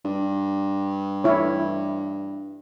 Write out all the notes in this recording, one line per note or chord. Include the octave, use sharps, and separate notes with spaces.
G2
E4 C#5